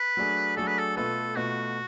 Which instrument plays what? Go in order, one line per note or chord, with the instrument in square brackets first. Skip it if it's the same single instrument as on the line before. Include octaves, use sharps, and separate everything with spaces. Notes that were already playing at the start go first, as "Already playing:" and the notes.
Already playing: [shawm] B4
[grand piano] F#3 A3 D4 G#4
[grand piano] F#3 A3 D4 G#4 [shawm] A4
[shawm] B4
A4
[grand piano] B2 A3 F4 B4 [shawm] A4
[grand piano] B2 A3 F4 B4 [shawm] F#4